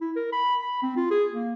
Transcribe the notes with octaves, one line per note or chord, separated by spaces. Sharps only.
E4
A#4
B5
B5
C4
F4
G#4
A#3